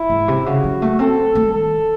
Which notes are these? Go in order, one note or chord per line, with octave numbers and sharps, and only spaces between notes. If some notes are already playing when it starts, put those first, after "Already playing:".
Already playing: E4
G#2
C3
C#3 F#4
F#3
A3
C4 A4
A3
D#3 A4